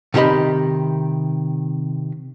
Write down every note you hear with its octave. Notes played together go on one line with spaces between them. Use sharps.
C3 D#3 G4 D#5 B5